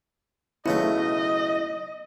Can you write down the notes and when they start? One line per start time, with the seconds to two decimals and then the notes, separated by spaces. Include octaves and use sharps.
0.66 B1 C#3 A3 E4 D#5